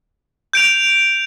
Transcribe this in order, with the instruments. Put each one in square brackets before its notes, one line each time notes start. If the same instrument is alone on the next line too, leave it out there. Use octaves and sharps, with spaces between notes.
[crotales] G6 D7 F7